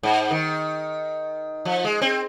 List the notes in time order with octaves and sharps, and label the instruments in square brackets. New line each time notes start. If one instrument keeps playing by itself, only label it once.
[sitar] G#2
D#3
F3
G#3
C4